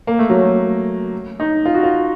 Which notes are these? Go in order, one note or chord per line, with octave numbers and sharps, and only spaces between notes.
A#3
A3
F#3
A3
D#4
F4
F#4
F4